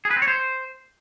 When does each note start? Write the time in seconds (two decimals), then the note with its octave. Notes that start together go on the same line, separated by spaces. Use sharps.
0.05 G#4
0.11 B4
0.16 C4
0.22 C#5
0.28 C5